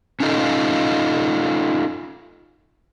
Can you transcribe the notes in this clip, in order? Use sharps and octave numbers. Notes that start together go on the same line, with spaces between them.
C#4 D#4 F4 A4 D#5 F5